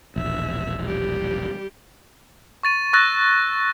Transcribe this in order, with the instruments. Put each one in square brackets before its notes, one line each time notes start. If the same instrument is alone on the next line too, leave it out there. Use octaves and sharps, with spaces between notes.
[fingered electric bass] E1 A#1 [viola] E5
[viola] G3 G4
[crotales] C#6 A6 D#7
C#6 E6 F#6 A6 A#6